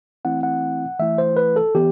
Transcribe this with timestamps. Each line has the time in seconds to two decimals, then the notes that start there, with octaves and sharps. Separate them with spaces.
0.25 E3 A3 C4 E4 F#5
0.43 F#5
0.99 E3 A3 E4 E5
1.18 C5
1.37 B4
1.56 A4
1.75 E3 B3 G4